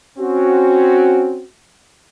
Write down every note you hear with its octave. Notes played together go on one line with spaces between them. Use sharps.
C4 C#4 F#4